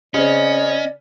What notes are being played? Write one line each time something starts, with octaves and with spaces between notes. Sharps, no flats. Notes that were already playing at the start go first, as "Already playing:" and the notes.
C#3 C4 C#4 D5 D#5